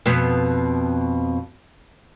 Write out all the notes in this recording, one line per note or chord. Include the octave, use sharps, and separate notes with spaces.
F2 B2 B3